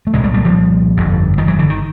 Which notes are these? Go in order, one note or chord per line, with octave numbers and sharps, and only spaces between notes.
A3
C2 A#2 G#3 A#3
G3 A3
G3 A3
F3 G3
G1 F2 D3
D#3 F3
E3 F#3
D3 E3
D#3